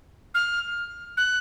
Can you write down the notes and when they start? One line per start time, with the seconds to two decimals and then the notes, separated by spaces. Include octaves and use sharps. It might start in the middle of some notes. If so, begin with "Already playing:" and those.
0.34 F6
1.17 F#6